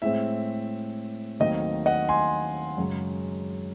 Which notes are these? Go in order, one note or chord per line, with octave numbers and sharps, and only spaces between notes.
A2 G#3 C4 E5
D#2 D#3 F#3 A3 C4 D#5
D#5 F#5
G#5 C6
F#2 C#3 G#3